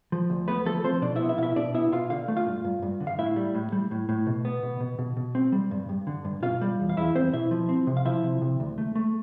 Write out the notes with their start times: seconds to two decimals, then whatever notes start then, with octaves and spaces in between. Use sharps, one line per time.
0.12 F3
0.30 D2
0.48 A3 B3 B4
0.65 F3 A3 A4
0.84 F3 C4 C5
1.02 B2 D4 D5
1.16 E4 E5
1.20 B3
1.29 E4 E5
1.38 B2 F5
1.43 E4 E5
1.56 B2 D4 D5
1.74 B3 E4 E5
1.92 B2 F4 F5
2.10 D3 F5
2.28 A3
2.37 F4 F5
2.47 G2
2.65 G2
2.82 G2
3.00 D3
3.07 F5
3.18 A2 E4 E5
3.36 G3
3.55 A2
3.72 G3
3.91 A2
4.09 A2
4.27 B2
4.45 B3
4.63 B2
4.80 B2
4.99 B2
5.17 B2
5.35 C4
5.52 G3
5.71 G2
5.89 G2
6.07 D3
6.25 G2
6.43 B2 F4 F5
6.61 G3
6.79 E2
6.89 F5
6.97 E2 E4 E5
7.15 E2 C4 C5
7.33 B2 E4 E5
7.51 F3
7.69 C4
7.87 C3
7.97 F5
8.05 F3 E4 E5
8.23 C3
8.42 C3
8.60 D2
8.78 A3
8.95 A3